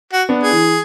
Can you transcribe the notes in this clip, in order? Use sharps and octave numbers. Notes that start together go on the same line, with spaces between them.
F#4
B3 D4
G#4
E3